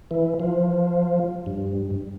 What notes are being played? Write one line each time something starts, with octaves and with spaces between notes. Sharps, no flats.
E3
F3
G2